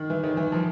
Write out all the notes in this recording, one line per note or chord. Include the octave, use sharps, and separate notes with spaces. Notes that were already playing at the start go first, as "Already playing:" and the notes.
Already playing: D#3
E3
D#3
E3
F3